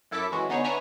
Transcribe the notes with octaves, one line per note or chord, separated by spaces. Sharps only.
F#2 E4 A4 A5 D6 B6
E3 G#3 C#4 F#4
D3 B3 D#4 G#4 C#5
D4 B4 C#5 E5 G#5 A#5